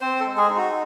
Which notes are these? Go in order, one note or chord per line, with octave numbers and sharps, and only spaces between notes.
C4 C5
A4
G#3
G#4
D#4
F#4